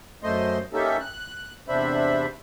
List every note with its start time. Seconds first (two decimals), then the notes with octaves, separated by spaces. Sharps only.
0.23 F#2 A3 C5 D#5 C6
0.73 A#3 C#4 D#4 G4 A4 E5
1.00 F#6
1.68 E2 C3 D4 C5 E5 B5